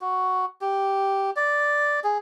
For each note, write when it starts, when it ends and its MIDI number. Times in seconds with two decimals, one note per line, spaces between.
0.01 0.45 66
0.61 1.30 67
1.36 2.00 74
2.04 2.18 68